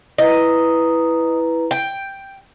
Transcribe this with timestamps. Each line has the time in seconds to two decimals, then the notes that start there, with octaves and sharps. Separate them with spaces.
0.18 E4 B4 D#5 A#5
1.71 G5